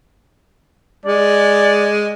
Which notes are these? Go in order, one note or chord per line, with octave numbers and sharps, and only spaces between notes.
G#3 D5